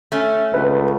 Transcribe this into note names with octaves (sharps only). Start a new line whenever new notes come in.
A3 C#4
C#2 B4